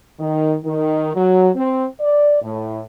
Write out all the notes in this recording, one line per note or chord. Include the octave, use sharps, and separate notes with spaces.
D#3
D#3
F#3
C4
D5
A2